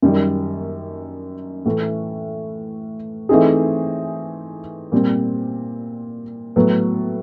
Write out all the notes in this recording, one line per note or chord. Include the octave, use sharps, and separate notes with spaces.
F#2 D#3 G3
A2 E3 A3
E3 A3 C4 D#4 G#4
A#2 G3 C4
A2 F#3 B3